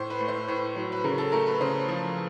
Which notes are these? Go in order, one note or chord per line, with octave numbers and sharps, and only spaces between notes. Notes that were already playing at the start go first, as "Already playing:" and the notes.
Already playing: A2 C5
B4
A3
C5
A2 B4
F#3
B4
C#3 A#4
A4
A3 A#4
B4
C#3 C5
F3